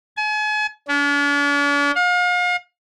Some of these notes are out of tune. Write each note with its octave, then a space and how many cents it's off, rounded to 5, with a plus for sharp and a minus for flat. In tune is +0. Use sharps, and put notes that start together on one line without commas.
G#5 +40
D4 -45
F5 +40